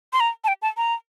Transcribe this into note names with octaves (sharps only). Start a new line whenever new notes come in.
C6
A#5
A5
G5
A5
A#5